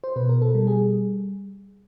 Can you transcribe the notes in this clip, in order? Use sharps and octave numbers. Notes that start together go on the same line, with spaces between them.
C5
B2 B4
A#4
A4
G3
G#4